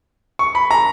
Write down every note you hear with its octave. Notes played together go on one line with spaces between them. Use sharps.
C#6
B5
A#5